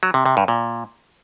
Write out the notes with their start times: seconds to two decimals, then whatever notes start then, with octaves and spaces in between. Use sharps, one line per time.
0.03 F#3
0.14 C3
0.26 C3
0.37 G2
0.48 A#2